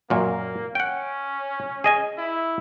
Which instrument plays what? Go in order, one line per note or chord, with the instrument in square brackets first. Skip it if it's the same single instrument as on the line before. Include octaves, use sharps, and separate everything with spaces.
[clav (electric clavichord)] F#2 A#2 [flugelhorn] A#3
[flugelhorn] C#4 [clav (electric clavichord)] F#5 G5
[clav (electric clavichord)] G#4 D#5 G#5
[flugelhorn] E4